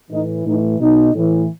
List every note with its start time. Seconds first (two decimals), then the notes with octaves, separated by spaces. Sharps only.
0.11 A2 E3 D#4
0.46 A2 E3 D#4
0.80 B2 D#4
1.14 A2 E3